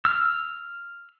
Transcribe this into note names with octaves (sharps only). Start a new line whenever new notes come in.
E6 F6